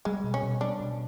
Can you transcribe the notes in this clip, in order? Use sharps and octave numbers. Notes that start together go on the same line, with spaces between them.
G3 G#3
B2
C#4
B2
G3 D4
B2